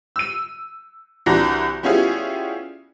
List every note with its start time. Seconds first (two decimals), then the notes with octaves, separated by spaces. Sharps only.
0.16 E6 D#7
1.26 C2 E3 D4 F#4 A#5 A#6
1.83 G3 B3 C#4 E4 F4 G#4